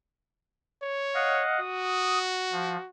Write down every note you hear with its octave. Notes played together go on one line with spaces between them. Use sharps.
C#5
D#5 F5 F#5
F#4 D#6
F3